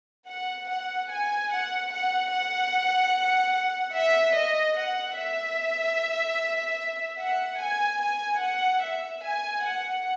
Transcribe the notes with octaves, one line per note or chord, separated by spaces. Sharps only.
F#5
F#5
G#5
F#5
F#5
F#5
E5
D#5
F#5
E5
F#5
G#5
G#5
F#5
E5
G#5
F#5